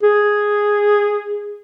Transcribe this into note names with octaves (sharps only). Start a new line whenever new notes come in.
G#4